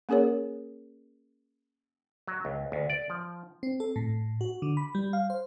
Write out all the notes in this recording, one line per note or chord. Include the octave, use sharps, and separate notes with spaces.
A#3 C#4 G#4 A#4 C#5
F#3
C#2
D2
D5
F3
C4
A4
A2
F#4
D3
B5
G3
F5
C5